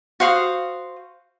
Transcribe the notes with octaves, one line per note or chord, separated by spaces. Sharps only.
F#4 C5 F5 D#6